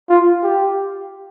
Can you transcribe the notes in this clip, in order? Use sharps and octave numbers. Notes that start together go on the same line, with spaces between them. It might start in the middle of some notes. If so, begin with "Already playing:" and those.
F4
G4